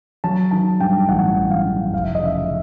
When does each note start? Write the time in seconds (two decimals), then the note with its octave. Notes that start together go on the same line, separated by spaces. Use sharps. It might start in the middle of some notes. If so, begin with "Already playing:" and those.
0.24 F#3 A5
0.51 D#3 A5
0.80 G2 G5
1.08 A1 F#5
1.37 F#3
1.50 F5
1.65 D#3
1.93 F1 F5
2.04 E5
2.15 D#5
2.21 C#3 E5